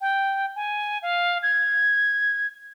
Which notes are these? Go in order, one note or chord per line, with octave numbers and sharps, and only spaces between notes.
G5
G#5
F5
G#6